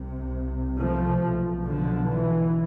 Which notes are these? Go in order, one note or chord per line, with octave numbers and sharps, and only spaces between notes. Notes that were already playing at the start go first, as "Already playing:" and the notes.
Already playing: C2 C3
F3 A3
B1 B2
D3 F3
E3